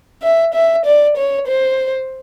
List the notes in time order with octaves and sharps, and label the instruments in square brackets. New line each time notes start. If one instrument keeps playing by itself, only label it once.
[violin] E5
E5
D5
C#5
C5